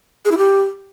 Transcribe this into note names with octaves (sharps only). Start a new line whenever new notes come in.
G#4
E4
G4